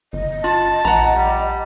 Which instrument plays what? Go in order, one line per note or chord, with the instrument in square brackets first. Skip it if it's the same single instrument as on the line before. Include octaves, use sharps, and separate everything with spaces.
[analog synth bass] G1 [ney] D#5
[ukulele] F4 [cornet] A5
[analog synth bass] A#1 [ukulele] F#5 A#5
[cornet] G3